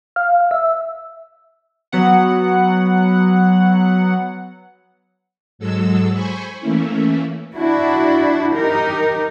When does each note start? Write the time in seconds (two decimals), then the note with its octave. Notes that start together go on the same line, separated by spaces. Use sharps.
0.16 F5
0.51 E5
1.92 F#3 B3 F#5
5.59 G#2 F#3 G#3 A4 E6
6.12 C5 G#5 B5 C#6
6.60 E3 A3 A#3 C#4 E4
7.56 D4 E4 F#4
8.55 D#4 G4 A#4